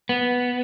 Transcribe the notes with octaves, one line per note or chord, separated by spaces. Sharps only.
B3